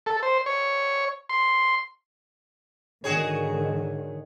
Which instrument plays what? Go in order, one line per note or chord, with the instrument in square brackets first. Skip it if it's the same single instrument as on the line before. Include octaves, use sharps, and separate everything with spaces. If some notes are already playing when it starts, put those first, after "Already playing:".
[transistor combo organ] A4
C5
C#5
C6
[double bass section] G#2 D3 D#3 [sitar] F#4 G#4 C#5